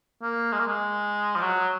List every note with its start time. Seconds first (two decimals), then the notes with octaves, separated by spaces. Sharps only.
0.22 A#3
0.52 G#3
0.59 A#3
0.68 G#3
1.36 F3
1.42 F#3